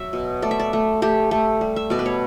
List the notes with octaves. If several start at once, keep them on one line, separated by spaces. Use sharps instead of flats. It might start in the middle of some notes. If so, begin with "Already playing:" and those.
Already playing: F#3 E5
B2
A3 D5
E5
D5
A3
A3 G4
A3
G3
E5
B2 D5
B4
C#5